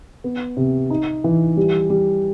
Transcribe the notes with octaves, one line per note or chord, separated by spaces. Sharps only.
B3
C3
D#4
E3
G3
G3